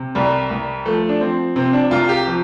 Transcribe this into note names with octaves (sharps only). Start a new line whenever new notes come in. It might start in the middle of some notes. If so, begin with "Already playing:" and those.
Already playing: C3
C2 G3
C2
F3 A3
D4
F3 C4
C3 C4
D4
C2 F4
G4
F3